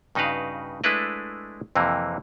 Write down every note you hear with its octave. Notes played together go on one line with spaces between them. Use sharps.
G2 C#3 D#4 F#4 B4 F5
G#3 A3 D4 E4 B4 D#5
F2 C3 E3 A#3